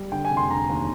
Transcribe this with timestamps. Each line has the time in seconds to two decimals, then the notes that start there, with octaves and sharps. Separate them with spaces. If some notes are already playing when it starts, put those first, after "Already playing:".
Already playing: G3
0.12 D3 G5
0.25 G#5
0.31 F1
0.37 C6
0.50 D3 A#5
0.69 D#2